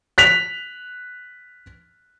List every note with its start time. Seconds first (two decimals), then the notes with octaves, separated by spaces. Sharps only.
0.18 F#6 B6 F7